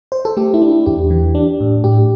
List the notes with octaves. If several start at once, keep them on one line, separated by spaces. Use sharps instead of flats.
C5
A4
A3 G4
E4
D4
E4
E2 G4
E3
D4
A2
A2 G4